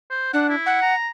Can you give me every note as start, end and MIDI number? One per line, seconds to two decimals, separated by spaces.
0.10 0.31 72
0.33 0.55 62
0.33 0.45 78
0.49 0.81 64
0.66 0.94 78
0.82 1.10 82